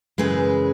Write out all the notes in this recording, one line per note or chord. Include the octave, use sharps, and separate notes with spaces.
F#2 C#3 E3 G#3 G#4 B4